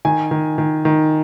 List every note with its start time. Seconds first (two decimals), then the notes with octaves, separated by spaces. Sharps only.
0.05 D#3 G#5
0.31 D#3
0.58 D#3
0.85 D#3